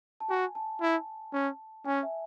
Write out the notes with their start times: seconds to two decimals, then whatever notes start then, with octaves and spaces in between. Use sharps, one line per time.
0.20 A5
0.29 F#4 G#5
0.55 A5
0.81 E4
1.33 C#4
1.85 C#4 G#5
2.03 E5